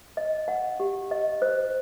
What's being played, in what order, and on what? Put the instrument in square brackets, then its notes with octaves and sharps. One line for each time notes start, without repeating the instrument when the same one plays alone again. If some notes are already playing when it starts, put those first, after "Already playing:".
[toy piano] D#5
F#5
G4
D#5
C5